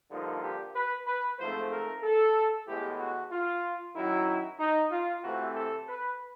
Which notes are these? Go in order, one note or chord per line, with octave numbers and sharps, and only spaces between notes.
G2 D3 F3 A#3 D#4
G4
B4
B4
G#2 F3 A3 C4 C5
A#4
A4
A2 E3 G#3 B3 G4
F#4
F4
F#2 D#3 F#3 E4
D#4
F4
C3 E3 A3 C4 F#4
A4
B4